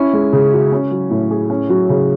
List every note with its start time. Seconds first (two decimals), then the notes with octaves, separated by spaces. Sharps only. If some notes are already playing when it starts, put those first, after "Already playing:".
Already playing: C#4 E4
0.13 G#3
0.33 C#3
0.53 F#4
0.72 C#4
0.91 F#3
1.10 A2
1.31 G#4
1.50 C#4
1.70 F#3
1.89 C#3